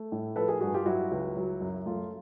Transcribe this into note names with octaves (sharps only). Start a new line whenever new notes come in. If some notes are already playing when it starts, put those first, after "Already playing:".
Already playing: A3
A2
F3 A4 B4
G#4 A#4
G2 F#4 G#4
F4 G4
F#3 E4 F#4
C#2
F#3
F#2
A3 F4